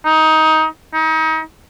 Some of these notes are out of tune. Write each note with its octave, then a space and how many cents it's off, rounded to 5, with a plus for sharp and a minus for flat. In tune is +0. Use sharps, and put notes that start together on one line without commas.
D#4 +20
D#4 +35